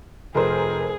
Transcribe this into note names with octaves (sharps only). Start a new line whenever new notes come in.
F1 G#4 A#4 C5